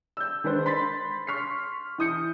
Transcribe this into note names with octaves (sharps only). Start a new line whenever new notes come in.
E6 G6
D#3 G#3 D4 B4 C5
B5 C6 A6 B6
C6 C#6 F6 B6 C7
E3 E4 D#6 G6 C#7